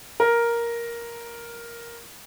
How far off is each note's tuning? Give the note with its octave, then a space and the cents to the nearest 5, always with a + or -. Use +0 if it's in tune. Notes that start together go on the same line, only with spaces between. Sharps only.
A#4 +5